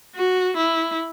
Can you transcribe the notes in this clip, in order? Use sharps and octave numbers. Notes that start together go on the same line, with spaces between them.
F#4
E4